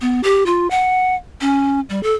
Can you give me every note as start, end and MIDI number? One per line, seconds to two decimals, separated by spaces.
0.01 0.21 59
0.23 0.46 67
0.46 0.69 65
0.70 1.15 78
1.41 1.80 61
1.89 2.02 55
2.03 2.13 69